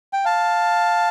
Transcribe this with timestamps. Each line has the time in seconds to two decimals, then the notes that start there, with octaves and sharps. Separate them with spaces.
0.13 G5
0.25 F5 A5